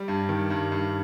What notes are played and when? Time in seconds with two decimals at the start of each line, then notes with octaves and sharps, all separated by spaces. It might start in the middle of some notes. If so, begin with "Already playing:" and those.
Already playing: G3
0.08 G2
0.29 D#3
0.50 G2
0.72 G2